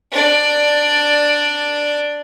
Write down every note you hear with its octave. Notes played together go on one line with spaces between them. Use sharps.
D4 D5